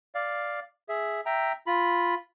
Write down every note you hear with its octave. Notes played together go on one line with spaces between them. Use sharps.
D5 F5
G#4 E5
E5 G5 A#5
F4 B5